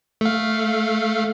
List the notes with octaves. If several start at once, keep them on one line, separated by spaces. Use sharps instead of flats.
A3 F5